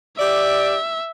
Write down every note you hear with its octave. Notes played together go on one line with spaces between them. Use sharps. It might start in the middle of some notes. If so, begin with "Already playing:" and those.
G4 D5 E5